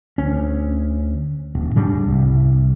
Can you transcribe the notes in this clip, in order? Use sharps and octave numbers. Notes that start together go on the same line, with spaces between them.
D2 C#4
D#1
G#2 C#3 G3 D4
C2